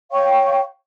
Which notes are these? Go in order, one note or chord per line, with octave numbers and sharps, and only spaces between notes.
C#5 F5 G5 C#6